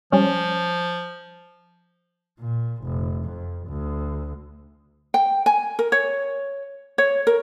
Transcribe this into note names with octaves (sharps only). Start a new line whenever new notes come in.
F3 G3 C#4
A#2
F1
F2
D2
G5
G#5
A#4
C#5
C#5
A#4